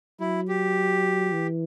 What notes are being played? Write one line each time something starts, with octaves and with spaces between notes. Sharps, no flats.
F#3 E4
G4
E3